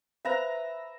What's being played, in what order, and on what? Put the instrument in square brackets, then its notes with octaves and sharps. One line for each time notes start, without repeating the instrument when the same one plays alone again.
[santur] B4 E5 A#5 [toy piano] C5 F5